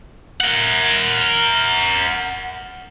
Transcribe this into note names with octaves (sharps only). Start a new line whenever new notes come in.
A#4 F#5